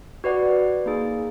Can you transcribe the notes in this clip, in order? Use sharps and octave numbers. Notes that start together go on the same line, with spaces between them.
F#4 B4 D5 F#5
A#3 D#4 G#4